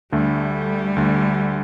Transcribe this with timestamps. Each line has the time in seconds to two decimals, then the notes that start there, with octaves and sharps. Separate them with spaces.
0.12 D2 D3 G3 A3
0.96 D2 D3 A3